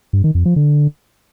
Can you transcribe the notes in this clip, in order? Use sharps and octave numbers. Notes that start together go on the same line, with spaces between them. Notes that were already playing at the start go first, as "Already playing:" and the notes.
G2
D#3
F2
F3
D3